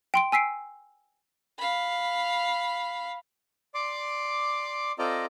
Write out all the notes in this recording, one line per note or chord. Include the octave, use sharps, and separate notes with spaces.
G5 C6 D7
G#5 E6 B6 C7 D7
F5 B5
D5 C6 D6
C4 F4 A4 D5 D#5 A#5